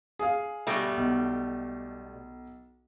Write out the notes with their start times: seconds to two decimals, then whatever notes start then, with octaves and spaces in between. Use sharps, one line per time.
0.19 G#4 F5
0.67 B2 G3 A3
0.97 B1